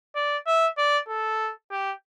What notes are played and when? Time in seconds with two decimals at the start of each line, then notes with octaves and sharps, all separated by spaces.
0.15 D5
0.47 E5
0.78 D5
1.08 A4
1.71 G4